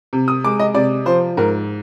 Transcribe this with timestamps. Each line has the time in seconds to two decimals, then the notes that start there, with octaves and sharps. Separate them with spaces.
0.13 C3
0.28 D#6
0.44 G#3 D6
0.59 D#5
0.74 C3 D5
1.06 F3 C5
1.37 G#2 A#4